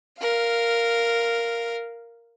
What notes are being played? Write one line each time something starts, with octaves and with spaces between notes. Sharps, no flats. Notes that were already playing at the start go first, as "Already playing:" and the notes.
A#4 F5